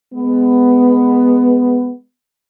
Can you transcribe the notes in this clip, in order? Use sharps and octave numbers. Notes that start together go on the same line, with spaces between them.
G#3 B3